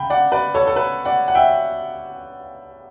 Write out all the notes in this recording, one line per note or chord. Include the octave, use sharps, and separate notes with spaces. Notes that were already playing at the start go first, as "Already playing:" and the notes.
Already playing: C#3 G5 B5
D5 F#5
B4 D5
A4 C#5
A4
B4
D5 F#5
F#5
E5 G5